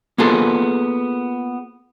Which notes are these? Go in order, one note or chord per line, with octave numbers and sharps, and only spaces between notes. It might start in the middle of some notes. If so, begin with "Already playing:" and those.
A#3 B3 F4 G#4 A4